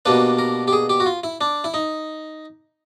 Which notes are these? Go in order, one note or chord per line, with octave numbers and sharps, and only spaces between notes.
B2 G3 A#3 D4 B4
A#4
G4
G#4
G4
F#4
F4
E4
D4
E4
D#4